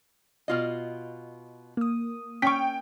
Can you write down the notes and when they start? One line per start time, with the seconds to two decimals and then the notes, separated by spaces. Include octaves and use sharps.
0.48 B2 F4 D#5
1.77 A#3 D#6
2.42 C#4 G5 C#6 B6